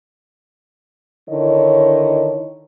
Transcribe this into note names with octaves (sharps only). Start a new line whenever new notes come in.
D3 D#3 E4 C#5 D#5